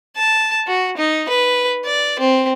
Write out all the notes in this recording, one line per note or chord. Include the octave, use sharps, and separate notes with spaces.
A5
F#4
D#4
B4
D5
C4